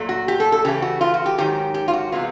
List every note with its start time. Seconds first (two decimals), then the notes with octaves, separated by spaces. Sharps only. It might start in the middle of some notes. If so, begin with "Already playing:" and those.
Already playing: A#2 F#3 A3
0.09 F#4
0.28 G4
0.40 A4
0.52 A4
0.65 C#3 E3 A3 G4
0.82 F#4
1.01 F4
1.14 F#4
1.26 G4
1.38 G#2 D#3 F#3 G4
1.74 G4
1.88 F4
1.93 F#4
2.12 C3 E3 G#3 B3 F4